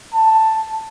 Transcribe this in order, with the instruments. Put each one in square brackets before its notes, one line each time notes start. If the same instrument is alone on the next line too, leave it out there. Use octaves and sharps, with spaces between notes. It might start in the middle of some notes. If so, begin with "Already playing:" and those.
[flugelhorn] A5